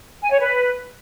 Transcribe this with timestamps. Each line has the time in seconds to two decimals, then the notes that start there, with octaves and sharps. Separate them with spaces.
0.22 G#5
0.31 C#5
0.40 B4